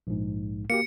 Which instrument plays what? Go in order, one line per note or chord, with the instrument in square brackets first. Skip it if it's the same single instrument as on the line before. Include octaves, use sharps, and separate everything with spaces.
[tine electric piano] A#1 G#2
[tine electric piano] A#3 F#4 G4 [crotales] C#7